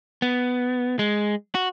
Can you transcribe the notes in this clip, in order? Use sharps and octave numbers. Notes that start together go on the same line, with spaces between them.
B3
G#3
F#4